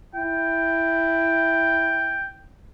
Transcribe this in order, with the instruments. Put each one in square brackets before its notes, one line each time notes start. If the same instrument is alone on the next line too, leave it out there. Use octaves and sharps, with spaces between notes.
[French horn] E4 [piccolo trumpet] G5